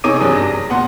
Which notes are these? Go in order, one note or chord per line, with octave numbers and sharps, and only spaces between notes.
C3 D#4 G#4 C#5 D6 D#7
F#1 G2 F#3 D4 G#4 D#6
A#6
D1 A#2 B3 F#5 C6